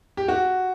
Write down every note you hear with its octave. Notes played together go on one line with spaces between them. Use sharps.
G4
F#4